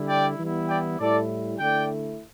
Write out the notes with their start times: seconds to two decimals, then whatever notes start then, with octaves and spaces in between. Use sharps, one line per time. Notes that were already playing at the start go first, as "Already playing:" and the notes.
Already playing: D3 G3 E4
0.09 D5 G5
0.39 E3 G3 B3 E4
0.69 D5 G5
0.99 A2 G3 E4 A4 D5
1.59 D3 A3 E4 D5 G5